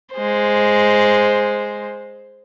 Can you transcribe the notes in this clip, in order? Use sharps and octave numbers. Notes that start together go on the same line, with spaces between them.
G#3 C5